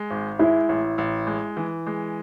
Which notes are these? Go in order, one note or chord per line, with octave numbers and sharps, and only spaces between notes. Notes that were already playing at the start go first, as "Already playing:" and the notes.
Already playing: G#3
G#1
G#3 E4
A1
A1
G#3
E3
G#3